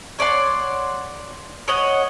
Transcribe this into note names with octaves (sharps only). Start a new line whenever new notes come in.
C#5 D5 F#5 C6
C#5 D#5 F#5